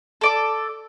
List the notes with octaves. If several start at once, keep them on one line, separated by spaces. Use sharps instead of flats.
A4 D5 D6